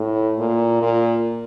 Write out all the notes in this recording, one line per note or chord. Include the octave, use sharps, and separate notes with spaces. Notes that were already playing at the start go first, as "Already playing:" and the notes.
Already playing: A2
A#2
A#2